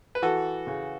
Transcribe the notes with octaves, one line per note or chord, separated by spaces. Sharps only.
B4
E3 F#4 A4
C#3